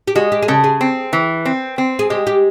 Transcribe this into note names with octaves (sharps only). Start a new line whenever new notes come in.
G4
G#3 F#4
G4
G#4
C#3 A4
G#4
C4
E3
C4
C4
G#4
G#3 G4
G4